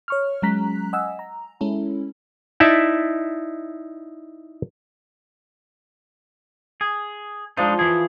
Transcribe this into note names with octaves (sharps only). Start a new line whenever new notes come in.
C#5 C#6 F6
F#3 G#3 C#4 A#5 F#6 B6
D#5 F#5 G#5 E6
A#5
G#3 C#4 E4 A4
D#4 E4 D5 E5 A5
G#4
F3 G#3 D4 D#4
E3 G#4